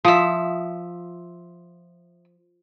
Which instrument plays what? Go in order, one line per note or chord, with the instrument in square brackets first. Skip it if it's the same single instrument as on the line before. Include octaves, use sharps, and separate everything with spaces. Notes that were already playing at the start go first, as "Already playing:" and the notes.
[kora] F3 [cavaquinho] E5 D#6